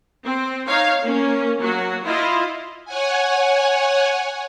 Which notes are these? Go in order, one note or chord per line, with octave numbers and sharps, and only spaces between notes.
C4
D#4 C#5 F5
A#3 C#4
F#3 A#3 F#4
E4 F4 D#5
C#5 F#5 G#5